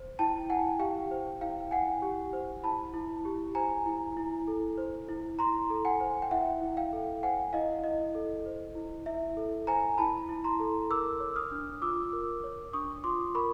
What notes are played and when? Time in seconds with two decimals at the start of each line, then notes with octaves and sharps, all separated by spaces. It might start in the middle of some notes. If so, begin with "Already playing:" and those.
Already playing: C5
0.19 E4 G5 A5
0.49 E4 F#5 G#5
0.79 G4 F5 G5
1.11 C5
1.41 E4 F5 G5
1.71 E4 F#5 G#5
2.02 G4
2.33 C5
2.63 E4 A5 B5
2.94 E4
3.25 G4
3.55 C5 G#5 A#5
3.86 E4
4.17 E4
4.48 A4
4.78 C5
5.08 E4
5.39 E4 A#5 C6
5.70 A4
5.85 F#5 G#5
6.00 C5
6.22 G5
6.31 E4 E5 F#5
6.61 E4
6.77 F5 G5
6.93 A4
7.23 C5 F#5 G#5
7.53 E4 D#5 F5
7.84 E4 D#5
8.15 A4
8.46 C5
8.75 E4
9.06 E4 E5
9.37 A4
9.67 C5 G#5 A#5
9.98 E4 A5 B5
10.29 E4
10.44 A#5 C6
10.60 A4
10.90 A#4 D6 E6
11.20 C#5
11.36 D#6 F6
11.52 D4
11.82 F4 D6 E6
12.13 A#4
12.44 C#5
12.73 D4 C#6 D#6
13.04 F4 C6 D6
13.35 A#4 B5 C#6